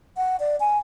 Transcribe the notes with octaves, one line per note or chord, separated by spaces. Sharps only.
F#5
D5
G#5